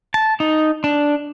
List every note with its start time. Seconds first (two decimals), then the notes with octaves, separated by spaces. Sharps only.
0.14 A5
0.40 D#4
0.84 D4